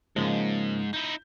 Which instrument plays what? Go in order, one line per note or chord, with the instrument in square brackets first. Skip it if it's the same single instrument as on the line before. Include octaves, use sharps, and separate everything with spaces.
[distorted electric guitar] G#2 [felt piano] C#3 F3 A#3 [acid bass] G#3
[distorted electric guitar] D#4 E4 [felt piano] G6